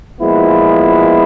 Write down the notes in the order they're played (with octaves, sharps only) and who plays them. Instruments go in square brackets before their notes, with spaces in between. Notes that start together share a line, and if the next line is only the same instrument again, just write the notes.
[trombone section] A#2 F3 G#3 B3 E4